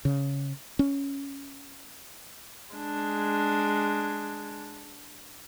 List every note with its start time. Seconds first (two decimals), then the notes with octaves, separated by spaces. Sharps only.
0.05 C#3
0.79 C#4
2.74 G#3 D4